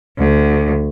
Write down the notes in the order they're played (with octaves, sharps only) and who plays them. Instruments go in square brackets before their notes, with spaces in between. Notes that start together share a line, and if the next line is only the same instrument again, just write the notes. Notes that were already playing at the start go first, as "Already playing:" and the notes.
[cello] D2